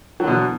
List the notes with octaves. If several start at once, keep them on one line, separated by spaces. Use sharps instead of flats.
B2 D3 E3 F#3